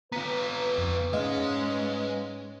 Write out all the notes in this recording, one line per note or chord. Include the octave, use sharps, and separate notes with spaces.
B3 F4 B4 A#5 B6
F2
G#2 G#3 C#4 D#5 F5
B4